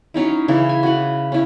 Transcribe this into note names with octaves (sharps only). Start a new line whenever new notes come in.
F#3 C#4 D#4 E4
C#3 E3 E4
G#5
F#4 B4
C#4 E4